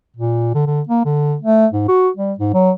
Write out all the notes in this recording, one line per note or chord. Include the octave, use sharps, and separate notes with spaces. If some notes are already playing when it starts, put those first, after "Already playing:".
A#2
D3
D3
A#3
D3
A3
G#2
F#4
G3
G#2
F#3